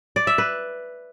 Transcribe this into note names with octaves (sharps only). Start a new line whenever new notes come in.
D5
E5
B4